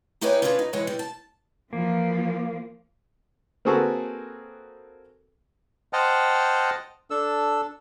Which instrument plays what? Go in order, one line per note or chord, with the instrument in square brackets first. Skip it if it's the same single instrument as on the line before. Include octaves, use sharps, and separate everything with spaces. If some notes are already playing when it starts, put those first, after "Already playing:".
[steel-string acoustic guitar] D#4 E4 G4 G#4 B4 C#5
C#4 D4 F4 G#4 A#4 B4
D#4
E3 G#3 G#4 B4 C#5
G3
A5
[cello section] E3 F3 [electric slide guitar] A#3
[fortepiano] A#3 C4 F#4 G#4 A4 B4
[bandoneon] C5 D#5 F#5 G5 A5 F6
D4 A4 E6